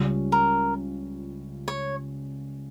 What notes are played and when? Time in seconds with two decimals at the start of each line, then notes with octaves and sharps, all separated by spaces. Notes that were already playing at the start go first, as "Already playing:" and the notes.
Already playing: C#2 C#3 G3 C#4 F4
0.32 A#4
1.68 C#5